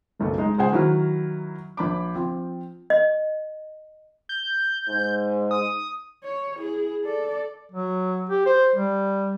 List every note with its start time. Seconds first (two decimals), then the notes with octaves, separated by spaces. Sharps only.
0.19 F#1 B1 A3
0.38 G#3 D#4
0.58 C#2 G#4 C5 F#5 G#5
0.72 D#3 F#3 E4 F6
1.77 A#1 B5 D6
2.15 F3 C4
2.90 D#5
4.29 G6
4.89 G#2
5.51 D#6
6.24 C#5
6.57 E4 G#4
7.04 A4 D5
7.72 F#3
8.29 G4
8.46 C5
8.76 G3